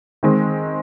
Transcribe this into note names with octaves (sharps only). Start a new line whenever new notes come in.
D#3 G#3 C4